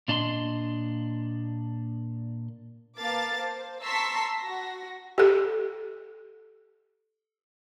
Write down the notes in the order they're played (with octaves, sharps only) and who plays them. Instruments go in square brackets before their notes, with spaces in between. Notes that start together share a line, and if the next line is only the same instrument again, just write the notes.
[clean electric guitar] A#2 D4 D#5 A#5 C6
[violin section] A#3 B4 F5 A5 D6 A6
C5
A5 A#5 C6 C#6 E6 B6
F#4 A#6
[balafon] G4 A4